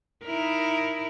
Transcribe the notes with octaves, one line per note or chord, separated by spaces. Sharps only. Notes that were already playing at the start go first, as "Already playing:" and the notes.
D#4 E4 A#4